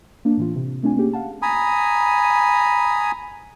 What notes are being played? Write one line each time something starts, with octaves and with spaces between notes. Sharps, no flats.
A#3 D4
A2 E3 F4
C3
A3 C4 D4 F4 G#5
A#3 C#4 G4 G#4
F5 F#5 A5
G#5 A#5 B5 D#6